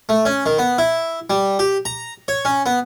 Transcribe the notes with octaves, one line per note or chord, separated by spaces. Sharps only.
A3
C#4
D#3
B3
E4
G3
G4
A#5
C#5
C#4
B3